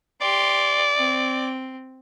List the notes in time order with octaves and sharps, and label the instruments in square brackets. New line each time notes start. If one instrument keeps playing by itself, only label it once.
[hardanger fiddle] G4 C6 [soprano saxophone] D5
[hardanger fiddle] C4